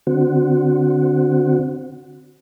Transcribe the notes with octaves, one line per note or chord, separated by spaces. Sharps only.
D3 C4 F#4